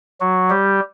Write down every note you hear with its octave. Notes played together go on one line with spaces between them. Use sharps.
F#3 F#4
G3 G4